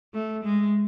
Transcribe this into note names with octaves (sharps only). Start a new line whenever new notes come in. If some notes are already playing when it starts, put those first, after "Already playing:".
A3
G#3